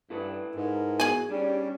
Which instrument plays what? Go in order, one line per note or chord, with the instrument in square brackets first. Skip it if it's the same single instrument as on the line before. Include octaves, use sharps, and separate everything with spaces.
[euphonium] G2 [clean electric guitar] E4 A4 B4
[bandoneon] G#2 [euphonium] A#4
[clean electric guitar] B2 E3 [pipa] G#4 G#5
[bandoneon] G3 [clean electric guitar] C#4 D4 [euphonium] G4